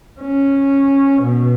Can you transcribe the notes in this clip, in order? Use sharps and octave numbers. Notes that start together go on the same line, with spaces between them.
C#4
B2